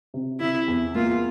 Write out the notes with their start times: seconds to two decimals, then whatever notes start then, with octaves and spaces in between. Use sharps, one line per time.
0.14 C3
0.40 C3 E4
0.68 E2
0.95 A#3 F4